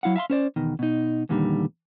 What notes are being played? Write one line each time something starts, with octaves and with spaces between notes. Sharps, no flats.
F#3 E4 F5 F#5
E5 F5 A#5 C6
C#4 C5 D5
E2 B2 D#3
B2 D#4
E2 A#2 D3 D#3 G3